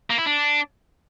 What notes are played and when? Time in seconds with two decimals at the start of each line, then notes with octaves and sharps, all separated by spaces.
0.10 A#3
0.18 E4
0.26 D4